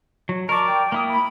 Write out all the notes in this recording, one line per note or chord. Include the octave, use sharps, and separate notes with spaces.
F#3
A#4 D5 D#5 A5 C#6
G5
A#3 E4 D#6
B5